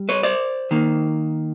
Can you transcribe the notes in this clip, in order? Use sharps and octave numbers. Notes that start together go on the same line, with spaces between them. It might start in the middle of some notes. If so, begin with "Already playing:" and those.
Already playing: G3
B4 C#5
C5 D5
D#3 A#3